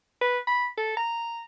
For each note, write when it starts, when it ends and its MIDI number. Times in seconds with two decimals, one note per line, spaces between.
0.21 0.39 71
0.47 0.67 83
0.78 0.94 69
0.97 1.42 82